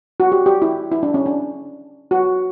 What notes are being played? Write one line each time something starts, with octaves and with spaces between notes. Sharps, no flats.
F#4
G4
G4
E4
E4
D4
C#4
D4
F#4